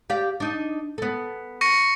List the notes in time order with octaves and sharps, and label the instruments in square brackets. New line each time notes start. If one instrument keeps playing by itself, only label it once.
[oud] G4 D5 F5
D4 D#4
B3 A4
[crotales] C#6 A#6 C#7